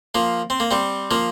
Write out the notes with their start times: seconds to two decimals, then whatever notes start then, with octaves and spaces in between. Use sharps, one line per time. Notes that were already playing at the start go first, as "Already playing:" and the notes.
0.15 F3 A#3
0.50 C4
0.60 A#3
0.71 G3 C4
1.11 F3 A#3